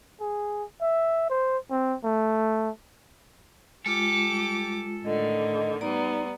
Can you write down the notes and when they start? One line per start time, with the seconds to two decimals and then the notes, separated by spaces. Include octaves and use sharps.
0.21 G#4
0.82 E5
1.30 C5
1.71 C4
2.04 A3
3.86 G#3 F4 G4 A4 D6
4.28 G3
5.05 A2 D3 D#3 D#5
5.81 G3 B3 D#4 D5 A#5